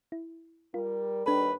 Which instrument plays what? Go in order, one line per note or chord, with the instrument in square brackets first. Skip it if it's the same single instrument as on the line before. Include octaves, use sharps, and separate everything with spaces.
[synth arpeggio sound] E4
[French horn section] G3 A#4 [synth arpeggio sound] F4
[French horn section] D#2 G3 [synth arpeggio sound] D4 A4 [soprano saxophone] B4